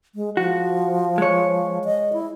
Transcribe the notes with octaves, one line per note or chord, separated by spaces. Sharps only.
G#3
F3 F#4
G#3 C#5
D#5
E4